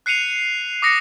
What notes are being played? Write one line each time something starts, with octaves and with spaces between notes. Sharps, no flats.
F#6 C7 C#7 D#7 F7
D6 D#6 A#6 C#7